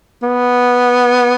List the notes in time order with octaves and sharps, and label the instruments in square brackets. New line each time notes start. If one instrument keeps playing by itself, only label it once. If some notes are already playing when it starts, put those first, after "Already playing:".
[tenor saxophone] B3